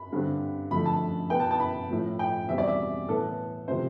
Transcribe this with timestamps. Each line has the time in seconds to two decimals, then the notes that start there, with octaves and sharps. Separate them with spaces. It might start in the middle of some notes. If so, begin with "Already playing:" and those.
Already playing: B5
0.12 G2 D3 G3 C4
0.71 F2 D3 A3 B5
0.86 A5
1.30 B2 B3 G5
1.40 A5
1.51 A5
1.60 B5
1.90 A2 F3 A3
2.19 G5
2.49 E2 B2 G3 C4 E5
2.58 D5
2.68 E5
3.08 A2 E3 B3 A4
3.68 C3 F3 A3 C4 C5